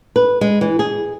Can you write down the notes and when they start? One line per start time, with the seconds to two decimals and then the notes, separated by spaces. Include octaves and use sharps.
0.16 B4
0.41 G#3
0.61 E3
0.79 G#4